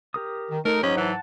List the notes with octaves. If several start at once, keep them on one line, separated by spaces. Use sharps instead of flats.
G4 A#4 D#6
D#3
A3 D#4 A#4
G#2 F#3 C#4 G4 B4 D#5
E3 F#5 A5